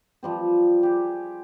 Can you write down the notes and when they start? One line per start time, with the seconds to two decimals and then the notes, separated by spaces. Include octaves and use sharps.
0.23 F3 G3 C4
0.83 G4 G#4